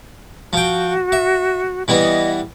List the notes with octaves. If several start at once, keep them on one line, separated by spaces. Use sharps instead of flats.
F3 F#4 G5
E5
E3 G3 B3 D#5